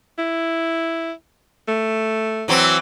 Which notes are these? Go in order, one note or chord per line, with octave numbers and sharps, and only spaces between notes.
E4
A3
E3 F#3 C4